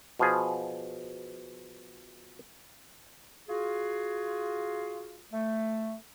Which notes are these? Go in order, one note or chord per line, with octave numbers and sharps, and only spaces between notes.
B2 F3 G#4
F4 F#4 G#4
A3